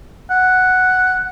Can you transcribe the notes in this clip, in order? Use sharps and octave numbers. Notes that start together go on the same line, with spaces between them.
F#5